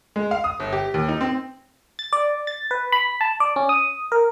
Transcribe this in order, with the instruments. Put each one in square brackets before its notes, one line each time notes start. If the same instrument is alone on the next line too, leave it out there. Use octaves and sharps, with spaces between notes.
[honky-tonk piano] G#3
F5
D#6
G1
G4
D#2
D#4
C4
[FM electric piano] A6
D5
A6
B4
B5
A5
D5
C#4
D#6
A#4